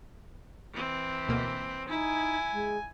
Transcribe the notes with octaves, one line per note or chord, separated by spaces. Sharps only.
E3 C4
D2 B2 A#3
D#4 E4 G#5
G#3